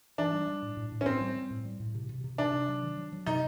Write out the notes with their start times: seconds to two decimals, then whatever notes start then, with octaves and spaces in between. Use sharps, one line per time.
0.18 E3 D4
0.32 G3
0.47 G3
0.62 A2
0.77 A2
0.92 A2
1.01 C#4
1.06 A2 C4
1.21 G3
1.36 G3
1.50 A2
1.65 G3
1.80 A2
1.95 C3
2.09 C3
2.24 C3
2.38 C3 D4
2.53 C3
2.68 F#3
2.83 D#3
2.97 F#3
3.12 F#3
3.26 C3 D#4